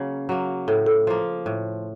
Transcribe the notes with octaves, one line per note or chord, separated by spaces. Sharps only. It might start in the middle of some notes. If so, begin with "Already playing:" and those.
Already playing: C#3 F#3 A#3
F#3 A#3
A2 A4
A4
F3 A#3
A2